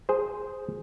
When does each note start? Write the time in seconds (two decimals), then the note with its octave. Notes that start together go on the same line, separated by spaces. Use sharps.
0.09 G#4 C5